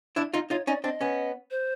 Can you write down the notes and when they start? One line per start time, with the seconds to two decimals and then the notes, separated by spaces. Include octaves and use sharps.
0.16 D4 E4
0.33 D#4 F4
0.50 D#4 F4 C#5
0.67 C#4 D#4 D5
0.84 C4 D4 D#5
1.01 B3 C#4
1.51 C5